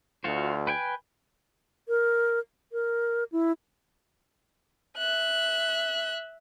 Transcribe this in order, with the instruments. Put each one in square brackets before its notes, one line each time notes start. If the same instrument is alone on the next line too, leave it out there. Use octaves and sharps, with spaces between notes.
[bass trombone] D2 [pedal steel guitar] F4 F#4 C5
[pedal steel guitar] B4 G5 G#5
[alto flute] A#4
A#4
E4
[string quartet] E5 F#6